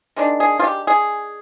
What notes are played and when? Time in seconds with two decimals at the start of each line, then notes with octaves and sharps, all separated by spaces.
0.16 D#3 G#3 D4
0.40 G#4
0.60 F4
0.64 G4
0.87 G#4